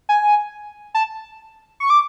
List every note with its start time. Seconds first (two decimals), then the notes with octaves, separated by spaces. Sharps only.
0.09 G#5
0.95 A5
1.80 C#6
1.90 D6